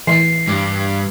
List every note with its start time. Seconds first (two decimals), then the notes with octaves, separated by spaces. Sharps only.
0.07 E3 C7
0.48 G2